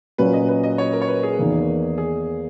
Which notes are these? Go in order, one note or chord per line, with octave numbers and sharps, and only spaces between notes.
A#2 F#3 C#4 B4
D#5
B4
D#5
C#5
A#4
C#5
B4
G#4
E2 D#3 A#3
G#4